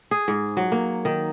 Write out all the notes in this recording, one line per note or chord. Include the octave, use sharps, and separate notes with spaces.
G#4
G#2
F#3
A#3
D#3